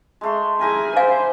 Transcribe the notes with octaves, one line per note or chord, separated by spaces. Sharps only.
G#3 A3 C6
E4 G4 G#4 A#4 G#5
C5 F5 G#5